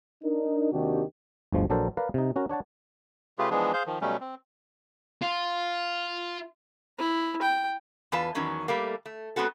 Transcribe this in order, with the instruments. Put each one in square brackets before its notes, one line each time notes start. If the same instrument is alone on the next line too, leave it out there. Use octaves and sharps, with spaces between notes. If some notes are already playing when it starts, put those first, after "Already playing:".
[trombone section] D4 D#4 A#4
D#2 C3 D#3 D4 F#4 G4
[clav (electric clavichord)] G1 D2 F3 G#3
A#1 F#3 D4 A4 A#4 C5
A#4 B4 D5 F5
C3 D#4
C#4 F#4 A#4
D4 C#5 F#5 A5
[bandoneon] C#3 A3 F4 G4 G#4 B4
E3 F3 G#3 B3 D4 G#4
G#4 C5 F5 G6
D#3 F3
B2 F#3 G3 A3 C#4
C4
[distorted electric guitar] F4
[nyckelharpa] E4
G5
[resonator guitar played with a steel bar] E2 F4 B4 A5
E2 D#3 F#3 C#4 D#4
G3 A3 A#3
A3
G#3 B3 C4 F#4 A4